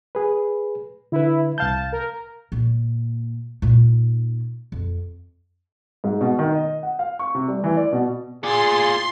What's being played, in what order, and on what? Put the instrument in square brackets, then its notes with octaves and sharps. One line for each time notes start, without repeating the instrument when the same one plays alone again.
[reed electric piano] G#4 B4
[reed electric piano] D3 B4 [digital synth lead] E4
[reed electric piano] C2 F5 G6 [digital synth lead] A5
[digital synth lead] A#4
[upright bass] A#2
A#2 D#4
F2
[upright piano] G#2
B2
D#3
D#5
F#5
F5
C#6
C3
G3
E3
D5
B2
[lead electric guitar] F4 D5 [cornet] G#4 [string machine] C6